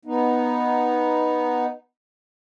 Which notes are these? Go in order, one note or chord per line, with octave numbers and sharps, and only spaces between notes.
B3 D#4